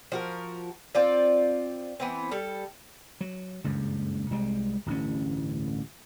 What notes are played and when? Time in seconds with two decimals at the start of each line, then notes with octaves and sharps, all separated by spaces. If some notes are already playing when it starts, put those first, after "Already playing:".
0.12 F3 F#4 A#4
0.95 C4 F4 D5
2.00 E3 B3 C4
2.31 G3 A4
3.21 F#3
3.64 F#1 C#2 G2
4.31 C2 G3 G#3
4.86 D1 A1 G2 C#4